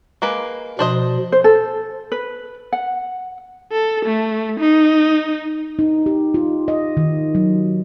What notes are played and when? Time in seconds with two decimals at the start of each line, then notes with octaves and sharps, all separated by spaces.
0.22 G#3 A#3 B4
0.79 B2 F3 D4 C5 D#5
1.32 C5
1.44 A4
2.12 B4
2.73 F#5
3.72 A4
4.05 A3
4.60 D#4
5.79 D#4
6.06 G4
6.34 F4
6.68 D#5
6.97 D#3
7.35 F#3